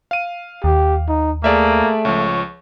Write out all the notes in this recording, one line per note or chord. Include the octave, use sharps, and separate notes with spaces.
F5 D#7
D#2 G4
D#4
A3 A#3 G#4 D5 E5
C#2 F3 C#5